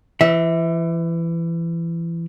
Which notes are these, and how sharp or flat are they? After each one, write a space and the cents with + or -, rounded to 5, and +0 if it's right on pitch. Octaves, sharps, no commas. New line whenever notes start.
E3 +25 E5 -15